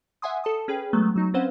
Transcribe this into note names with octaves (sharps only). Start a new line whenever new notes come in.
E5 F#5 G#5 C6 D#6
A4 A5 D#6
C#4 G#4 B4 G5
F#3 G#3 A3 B3
F#3 D#4
C4 C#4 B4 C5 F5 F#5